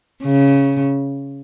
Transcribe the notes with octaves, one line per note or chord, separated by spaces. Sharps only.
C#3